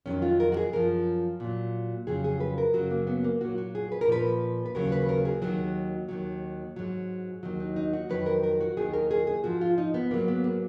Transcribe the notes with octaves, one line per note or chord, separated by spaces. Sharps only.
F2 D#3 F#3 C#4
F4
A#4
F#4
G#4
F#2 F3 A#4
A#2 F#3
F2 C#3 F#3 G#4
G#4
B4
A#4
F#2 C#3 F#3 F#4
A#3
B3
A#3
A#2 F#3 F#4
F#4
G#4
B4
A#4
A#2 F3 B4
B4
D#2 C#3 F#3 A#4
B4
A#4
G#4
D#2 D#3 F#3 F#4
D#2 D#3 F#3
G#2 F#3
D#2 D#3 F#3
D#4
D#4
F#4
F2 D#3 F#3 B4
A#4
A#4
F#4
D#2 D#3 F#3 G#4
A#4
G#4
G#4
G#2 F3 F#4
F4
D#4
B3
G#2 F#3 A#3
B3
A#3